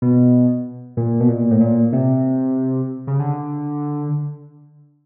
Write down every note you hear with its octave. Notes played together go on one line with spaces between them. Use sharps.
B2
A#2
B2
A#2
A2
A#2
C3
C#3
D3